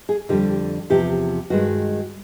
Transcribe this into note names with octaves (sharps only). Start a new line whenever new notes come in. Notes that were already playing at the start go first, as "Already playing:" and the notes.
G#4
F2 D3 G3 G4
E2 C3 F3 G4
G2 D#3 G#3 F#4